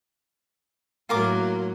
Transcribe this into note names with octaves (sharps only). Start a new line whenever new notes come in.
A2 F#3 A#3 F4 A#4 D6